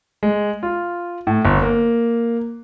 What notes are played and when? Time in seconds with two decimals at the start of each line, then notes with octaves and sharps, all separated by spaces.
0.23 G#3
0.63 F4
1.27 A2
1.45 G1
1.62 A#3